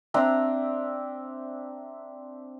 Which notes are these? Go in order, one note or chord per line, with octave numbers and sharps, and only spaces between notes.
C4 D4 E5 A#5